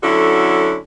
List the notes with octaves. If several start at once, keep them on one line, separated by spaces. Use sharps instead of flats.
D3 F#3 C#4 E4 F#4 A4